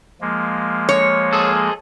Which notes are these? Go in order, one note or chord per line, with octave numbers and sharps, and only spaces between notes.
F3 G#3 A#3
C#5
G#4 A4